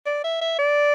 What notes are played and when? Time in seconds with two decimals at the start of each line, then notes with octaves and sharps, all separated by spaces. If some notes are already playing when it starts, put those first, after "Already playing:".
0.06 D5
0.24 E5
0.41 E5
0.58 D5